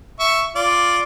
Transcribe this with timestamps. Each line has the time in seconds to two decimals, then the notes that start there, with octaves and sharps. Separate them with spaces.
0.20 E5 C#6
0.56 F4 D5